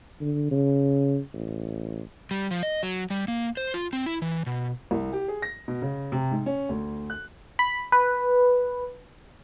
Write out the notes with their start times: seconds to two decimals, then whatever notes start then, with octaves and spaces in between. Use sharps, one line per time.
0.21 D3
0.51 C#3
1.33 A1
2.31 G3
2.51 F3
2.63 D#5
2.83 F#3
3.10 G3
3.28 A#3
3.57 C5
3.74 F4
3.93 C4
4.06 E4
4.22 E3
4.46 B2
4.91 C2
5.13 G4
5.28 G#4
5.42 A#6
5.68 B2
5.82 C#3
6.12 C3
6.31 G#2
6.46 C#4
6.69 D2
7.10 F#6
7.59 B5
7.92 B4